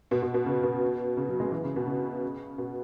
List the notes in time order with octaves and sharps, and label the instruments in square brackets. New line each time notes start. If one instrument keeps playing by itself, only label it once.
[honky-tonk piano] B2
B2
B2
C#3
B2
C#3
F#3
G#3
E3
C#3
B2
C#3
B2